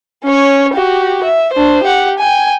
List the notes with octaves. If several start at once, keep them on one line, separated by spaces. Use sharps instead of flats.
C#4 C#5
F#4 G4
E5
D4 C5
G4 F#5
G5 G#5